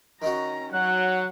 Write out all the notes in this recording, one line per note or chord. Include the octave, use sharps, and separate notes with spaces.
D#3 C#4 D#4 F#4 A#5
F#3 F#5 F#6